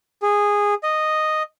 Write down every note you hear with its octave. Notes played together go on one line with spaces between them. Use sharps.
G#4
D#5